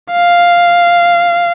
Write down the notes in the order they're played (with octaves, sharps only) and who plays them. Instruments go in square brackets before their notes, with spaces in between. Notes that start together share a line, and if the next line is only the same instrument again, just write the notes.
[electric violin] F5